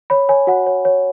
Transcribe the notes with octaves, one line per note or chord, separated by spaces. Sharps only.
C#5 B5
C#5 G#5
F#4 F#5
C#5
C#5